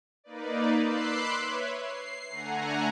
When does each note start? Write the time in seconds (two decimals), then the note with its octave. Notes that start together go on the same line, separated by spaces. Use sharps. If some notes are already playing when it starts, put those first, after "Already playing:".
0.24 A#3 D#4 B4 D5
0.77 B5 C6 D6 E6 F#6 C7
1.37 B4 C#5 E5
1.79 C7
2.30 D3 A3 F#5 G#5 A#5